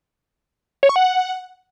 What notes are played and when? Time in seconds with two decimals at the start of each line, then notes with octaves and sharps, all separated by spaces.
0.83 C#5
0.89 C#6
0.96 F#5